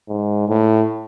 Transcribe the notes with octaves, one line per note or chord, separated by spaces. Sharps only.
G#2
A2